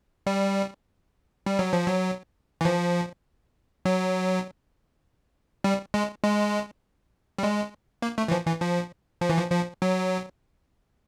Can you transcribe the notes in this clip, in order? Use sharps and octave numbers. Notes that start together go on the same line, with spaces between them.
G3
G3
F#3
F3
F#3
E3
F3
F#3
G3
G#3
G#3
G3
G#3
A#3
A3
E3
F3
E3
F3
F3
E3
F3
F3
F#3